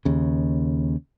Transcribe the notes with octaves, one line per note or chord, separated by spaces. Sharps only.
D#2 C#3